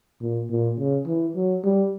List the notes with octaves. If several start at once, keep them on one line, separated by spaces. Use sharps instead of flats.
A#2
A#2
C#3
E3
F#3
G3